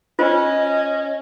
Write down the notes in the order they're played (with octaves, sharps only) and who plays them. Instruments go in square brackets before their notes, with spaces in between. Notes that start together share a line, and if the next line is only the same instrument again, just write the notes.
[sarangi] C#4 [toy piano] F4 C5 [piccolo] D#5